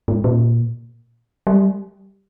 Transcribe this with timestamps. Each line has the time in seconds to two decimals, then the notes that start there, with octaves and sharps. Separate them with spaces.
0.08 G#2
0.24 A#2
1.47 G3